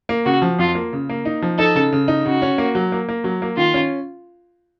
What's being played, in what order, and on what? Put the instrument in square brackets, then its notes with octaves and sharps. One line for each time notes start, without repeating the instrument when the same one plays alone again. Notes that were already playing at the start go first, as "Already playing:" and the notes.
[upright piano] A#3
[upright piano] C#3 [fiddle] F#4
[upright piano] F3
[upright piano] F2 [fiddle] F4
[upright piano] A#3
C#3
A#3
D#4
F3
[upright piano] D#4 [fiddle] A4
[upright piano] C#3
C#3
D#4
[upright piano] C#3 [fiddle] F#4
[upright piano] C#4
A#3
F#3
A#3
A#3
F#3
A#3
[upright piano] D#3 [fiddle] F4
[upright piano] C#4